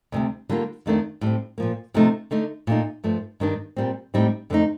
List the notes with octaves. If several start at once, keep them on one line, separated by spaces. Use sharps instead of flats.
D2 C3 G3
D3 G3 A#3 F4
F2 D#3 A3 D4
A2 G3 C4
A#2 F3 A#3
C3 F3 A3 D#4
D3 A3 D#4
A#2 A3 D#4
G2 F3 A3
G2 D#3 G3 D4
A#2 G3 C4
A2 G3 C4 D#4
F2 D3 A3 D#4